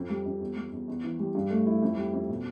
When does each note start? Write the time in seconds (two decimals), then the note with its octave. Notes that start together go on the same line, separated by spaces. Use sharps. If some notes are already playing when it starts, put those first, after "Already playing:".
Already playing: F2
0.10 G3
0.25 F2
0.40 E2
0.56 G3
0.72 E2
0.88 E2
1.03 E3
1.19 G3
1.35 G2
1.50 A3
1.66 E4
1.82 F2
1.97 G3
2.13 F2
2.29 B2